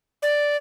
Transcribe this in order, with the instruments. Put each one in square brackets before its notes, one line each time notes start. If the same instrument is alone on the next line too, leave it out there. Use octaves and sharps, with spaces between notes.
[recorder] D5